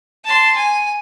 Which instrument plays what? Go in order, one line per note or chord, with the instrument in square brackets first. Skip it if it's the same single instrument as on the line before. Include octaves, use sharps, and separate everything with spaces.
[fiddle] A5 C6
G#5